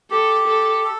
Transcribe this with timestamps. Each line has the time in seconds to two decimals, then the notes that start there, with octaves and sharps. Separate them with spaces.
0.10 G4 A4
0.47 A4
0.84 A4